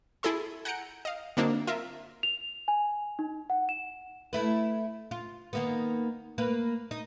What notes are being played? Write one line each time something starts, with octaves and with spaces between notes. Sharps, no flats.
E4 G#4 A4 E5 C6
F#5 G#5 A#5 G6 C#7 D7
D#5 F5
D3 F#3 A#3 C4 D4 D#4
F4 A#4 E5
F7
G#5
D#4
F#5
E7
A3 E4 B4
F4
D#3 A#3 B3
A#3 B4
D#4